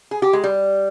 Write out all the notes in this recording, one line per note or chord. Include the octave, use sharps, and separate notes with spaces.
G#4
G4
G#3
G3